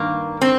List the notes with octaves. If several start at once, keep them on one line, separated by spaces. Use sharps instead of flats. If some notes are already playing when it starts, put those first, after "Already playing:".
Already playing: G2 D#3 A#3
C4